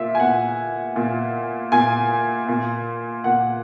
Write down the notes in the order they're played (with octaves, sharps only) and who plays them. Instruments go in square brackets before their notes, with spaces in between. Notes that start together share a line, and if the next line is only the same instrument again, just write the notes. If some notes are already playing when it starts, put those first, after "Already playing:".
Already playing: [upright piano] A#2 E5
G#5
A#2 F#5
A#2
A#2 G#5
A#2
A#2 F#5